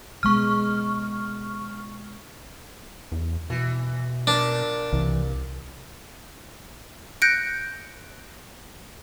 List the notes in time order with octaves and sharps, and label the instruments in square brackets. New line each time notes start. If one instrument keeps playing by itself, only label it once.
[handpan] B2 G#3 B3 [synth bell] C#6 F6
[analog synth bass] E2
[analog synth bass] B2 [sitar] E3
[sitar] A#2 A#4 [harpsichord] D4
[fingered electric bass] C2 [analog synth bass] E3
[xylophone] F#6 G6 A#6 C#7 D7